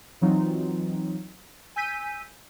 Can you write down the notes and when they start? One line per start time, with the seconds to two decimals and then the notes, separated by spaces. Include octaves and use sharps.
0.21 E3 F#3 C4 D#4 F4
1.76 G#5 E6 G6 B6 D#7